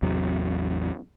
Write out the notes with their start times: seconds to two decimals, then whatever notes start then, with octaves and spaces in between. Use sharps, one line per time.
0.02 A1 E2 C3 F#3